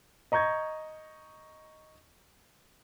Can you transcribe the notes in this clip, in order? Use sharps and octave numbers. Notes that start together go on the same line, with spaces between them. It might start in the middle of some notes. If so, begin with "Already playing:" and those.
D#5 A#5 C#6 G6 G#6